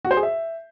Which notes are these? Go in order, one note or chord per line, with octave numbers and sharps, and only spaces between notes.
F#4
C5
G#4
E5